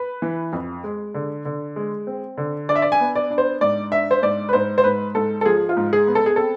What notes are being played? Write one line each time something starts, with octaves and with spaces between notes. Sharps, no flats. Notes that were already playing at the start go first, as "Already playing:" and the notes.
Already playing: B4
E3
F2
G#3
D3
D3
G#3
C4
D3
D4 D5
E5
D5
G#5
B3
D5
D4
C5
G#2 D5
D4 E5
C5
G#2 D5
B4
G#2 C5
C5
G#2 B4
G#2 A4
A4
F3 G#4
F4
G#2
G#4
B3
A4
G#4
C4 A4